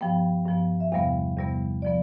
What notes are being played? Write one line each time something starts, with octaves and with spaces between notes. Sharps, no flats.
G2 F3 B3 G5
G2 F3 B3
E5
E2 C3 G3 B3 F5
E2 C3 G3 B3
F3 B3 D5